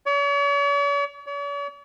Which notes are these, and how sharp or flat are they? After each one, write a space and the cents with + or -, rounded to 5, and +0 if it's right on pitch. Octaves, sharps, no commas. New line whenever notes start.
C#5 +45
C#5 +45